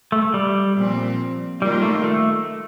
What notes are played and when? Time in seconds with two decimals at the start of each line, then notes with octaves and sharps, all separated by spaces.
0.12 A3
0.34 G3
0.76 A#2 F3 C4
1.61 D#3 G3 A#3 F4
1.82 A3
2.04 A3